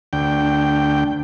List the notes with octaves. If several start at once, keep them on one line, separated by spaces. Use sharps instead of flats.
D2 G5